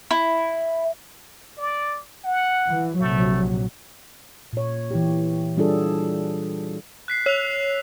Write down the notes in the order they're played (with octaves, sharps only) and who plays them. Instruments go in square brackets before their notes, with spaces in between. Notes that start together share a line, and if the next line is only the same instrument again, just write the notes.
[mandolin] E4
[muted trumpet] D5
F#5
[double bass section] E3
[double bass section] A#1 C3 F#3 [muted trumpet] A3
[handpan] A#2 C#5
E3 E4 G4
G3 D4 F4 G#4 A4
[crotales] F#6 B6 C7
[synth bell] C#5 [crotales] E6 B6 F7